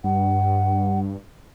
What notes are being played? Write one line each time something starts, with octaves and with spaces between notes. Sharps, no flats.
G2 F#5